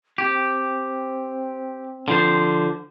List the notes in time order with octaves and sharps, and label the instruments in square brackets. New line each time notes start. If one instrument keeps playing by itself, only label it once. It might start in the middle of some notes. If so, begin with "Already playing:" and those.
[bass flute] C4 [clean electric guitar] G4
[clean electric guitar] D3 F3 C5